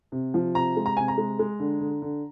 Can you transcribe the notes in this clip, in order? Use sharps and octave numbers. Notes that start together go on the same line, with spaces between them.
C3
F3
C3 A#5
G#3
A#5
C3 G#5
A#5
G#3
G#3
D3
D3
D3